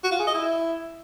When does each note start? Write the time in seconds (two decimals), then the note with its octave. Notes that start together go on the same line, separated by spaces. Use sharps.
0.04 F#4
0.12 F4
0.19 G#4
0.27 D#5
0.35 E4